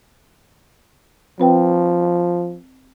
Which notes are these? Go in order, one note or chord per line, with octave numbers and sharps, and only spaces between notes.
F3 C4 B4 G5